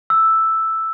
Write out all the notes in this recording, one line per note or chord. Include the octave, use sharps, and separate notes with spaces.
E6